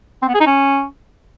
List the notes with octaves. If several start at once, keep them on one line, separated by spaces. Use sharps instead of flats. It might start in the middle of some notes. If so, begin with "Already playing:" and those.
C4
B3
G#4
D#4
C#4